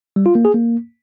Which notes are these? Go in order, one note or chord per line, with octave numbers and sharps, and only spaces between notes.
G3
F4
A#3
G#4
A#3